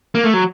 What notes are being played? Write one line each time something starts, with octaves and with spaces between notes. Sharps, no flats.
A#3
A3
F#3